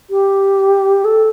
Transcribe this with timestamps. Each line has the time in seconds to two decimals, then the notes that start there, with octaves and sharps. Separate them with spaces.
0.10 G4
1.04 A4